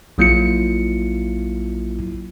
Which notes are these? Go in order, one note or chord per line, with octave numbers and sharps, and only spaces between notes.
A#1 F#3 A#3 E4 F4 C#7